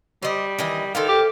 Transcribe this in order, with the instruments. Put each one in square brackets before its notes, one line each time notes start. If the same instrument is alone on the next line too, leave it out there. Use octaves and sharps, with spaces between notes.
[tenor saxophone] G3 [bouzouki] C5 D#5
[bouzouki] D#3 E3 D#5
[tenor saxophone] D#3 [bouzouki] A4 C5 F5
[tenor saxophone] G4